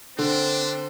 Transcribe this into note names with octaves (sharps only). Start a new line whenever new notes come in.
D3 C4 D4